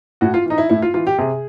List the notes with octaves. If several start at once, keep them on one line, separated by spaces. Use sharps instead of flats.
A2 F#4
F4
E3 D#4
E4
A2 E4
F4
E3 F4
G4
C3 G#4